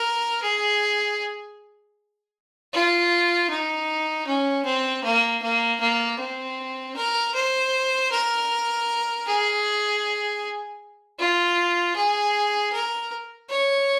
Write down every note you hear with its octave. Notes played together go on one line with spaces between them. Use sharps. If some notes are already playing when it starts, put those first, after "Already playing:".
Already playing: A#4
G#4
F4
D#4
C#4
C4
A#3
A#3
A#3
C4
A#4
C5
A#4
G#4
F4
G#4
A#4
C#5